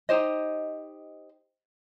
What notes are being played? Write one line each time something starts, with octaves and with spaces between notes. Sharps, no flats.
D#4 G4 C5 D#5